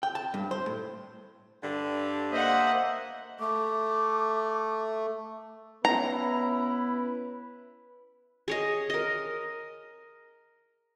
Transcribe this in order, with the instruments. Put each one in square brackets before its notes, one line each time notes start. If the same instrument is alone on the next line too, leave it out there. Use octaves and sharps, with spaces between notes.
[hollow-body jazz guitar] G5
A5
G2
C5
A2
[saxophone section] G2 D3
[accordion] A#3 C5 E5 [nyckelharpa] D#5 F#5
[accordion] A3 [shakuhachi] D6
[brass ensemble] B3 C#4 E4 [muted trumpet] B4 [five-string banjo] A#5
[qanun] G#4 C#5 D#5
A#4 D#5